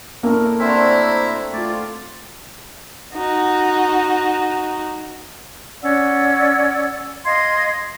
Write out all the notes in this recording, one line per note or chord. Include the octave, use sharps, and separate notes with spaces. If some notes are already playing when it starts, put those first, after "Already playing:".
A2 A3 A#3 A#4
C4 D4 E4 F#4 C5 E5 A#5
A3 F4 D5
D#4 F#4
C#4 D5 F#5 E6
D#5 F5 C6 G#6